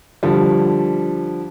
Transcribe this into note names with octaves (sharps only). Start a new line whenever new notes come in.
D3 F3 G3